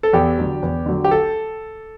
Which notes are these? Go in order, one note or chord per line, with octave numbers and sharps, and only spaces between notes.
A4
E2 G4
D3 F#3
E2
D3 F#3
G4
A4